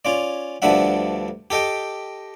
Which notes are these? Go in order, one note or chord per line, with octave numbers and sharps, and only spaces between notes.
C#4 F4 D5
D2 G2 F3 D4 E5 F#5
G4 A4 D#5 G5